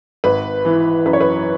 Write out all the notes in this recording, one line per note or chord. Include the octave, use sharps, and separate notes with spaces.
G#1 B4
E3
F#2 B4
C#5
B4